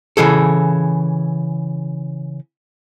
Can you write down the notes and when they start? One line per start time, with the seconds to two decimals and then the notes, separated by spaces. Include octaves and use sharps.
0.17 C#3 E3 G#4 A4